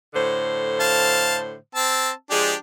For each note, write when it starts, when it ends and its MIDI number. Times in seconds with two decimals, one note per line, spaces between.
0.14 1.55 45
0.14 1.55 50
0.14 1.55 72
0.80 1.37 77
0.80 1.37 81
1.75 2.11 60
1.75 2.11 81
1.75 2.11 88
2.30 2.53 53
2.30 2.53 56
2.30 2.55 62
2.30 2.55 67
2.30 2.53 68